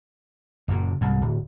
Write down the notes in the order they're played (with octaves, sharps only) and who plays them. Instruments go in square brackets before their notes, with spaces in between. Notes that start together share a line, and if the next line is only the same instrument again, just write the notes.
[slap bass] F#1 F#2 A#2
C2 G#2
D1